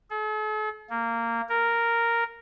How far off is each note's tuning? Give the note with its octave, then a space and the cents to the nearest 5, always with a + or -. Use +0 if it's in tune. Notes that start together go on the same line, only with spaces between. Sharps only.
A4 -45
A#3 -15
A#4 -5